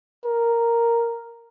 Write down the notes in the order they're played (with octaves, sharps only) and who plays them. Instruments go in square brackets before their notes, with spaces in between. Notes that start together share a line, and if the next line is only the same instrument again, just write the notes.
[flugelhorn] A#4